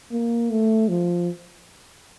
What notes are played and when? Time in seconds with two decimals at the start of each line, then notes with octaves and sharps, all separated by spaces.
0.12 A#3
0.50 A3
0.89 F3